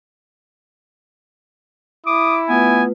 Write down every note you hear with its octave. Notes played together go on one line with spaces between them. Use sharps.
E4 D6 D#6
A3 B3 F4 B4 G#5